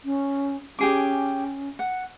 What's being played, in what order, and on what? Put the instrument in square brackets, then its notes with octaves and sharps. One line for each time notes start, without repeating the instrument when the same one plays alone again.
[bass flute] C#4
[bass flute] C#4 [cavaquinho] G4 G#4 D6
[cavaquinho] F#5